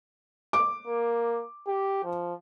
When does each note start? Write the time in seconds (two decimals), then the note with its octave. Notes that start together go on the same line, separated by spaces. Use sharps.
0.53 D6
0.87 A#3
1.68 G4
2.04 F3